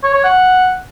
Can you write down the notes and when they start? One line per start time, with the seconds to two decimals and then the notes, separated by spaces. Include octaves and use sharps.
0.03 C#5
0.14 C#5
0.24 F#5